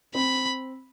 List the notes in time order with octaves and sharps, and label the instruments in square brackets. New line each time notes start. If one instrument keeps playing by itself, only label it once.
[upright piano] C4 [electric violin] B5